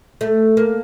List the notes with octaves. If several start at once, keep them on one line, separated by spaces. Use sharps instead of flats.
A3
A#3